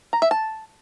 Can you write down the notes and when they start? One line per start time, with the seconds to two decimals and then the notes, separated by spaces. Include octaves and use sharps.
0.13 A#5
0.22 E5
0.31 A5